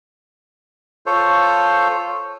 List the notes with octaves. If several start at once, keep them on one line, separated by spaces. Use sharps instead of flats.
F4 A4 C5 C#5